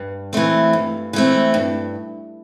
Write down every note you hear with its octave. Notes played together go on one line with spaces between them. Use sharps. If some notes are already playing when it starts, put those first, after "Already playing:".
Already playing: G2
E3 A3 C4
G2
E3 A3 C4
G2